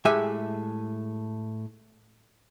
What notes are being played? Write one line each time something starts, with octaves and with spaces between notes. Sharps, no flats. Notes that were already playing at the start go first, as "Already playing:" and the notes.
A2 G#3 G4 E5 G#5